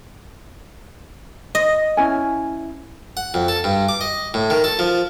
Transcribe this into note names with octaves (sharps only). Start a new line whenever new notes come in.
D#5
C#4 E4 G#5
F#5
F2
A4
G2
D6
D#5
A2
D#3
A4
F3